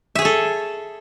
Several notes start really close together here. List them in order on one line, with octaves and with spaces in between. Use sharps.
E5 G#4 C#5 A4